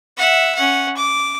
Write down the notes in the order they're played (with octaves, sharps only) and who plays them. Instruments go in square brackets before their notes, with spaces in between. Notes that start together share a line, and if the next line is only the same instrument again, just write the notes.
[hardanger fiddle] E5 F#5
C#4 F#5
D6